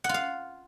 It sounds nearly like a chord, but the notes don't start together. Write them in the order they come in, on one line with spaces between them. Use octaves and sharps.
F#5 F4 F5